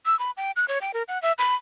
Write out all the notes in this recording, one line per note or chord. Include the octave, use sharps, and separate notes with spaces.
E6
B5
G5
F#6
C#5
G5
A#4
F#5
E5
B5